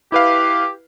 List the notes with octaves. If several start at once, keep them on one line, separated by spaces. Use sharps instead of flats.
E4 G4 B4 F5